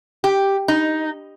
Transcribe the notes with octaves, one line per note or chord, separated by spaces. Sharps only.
G4
D#4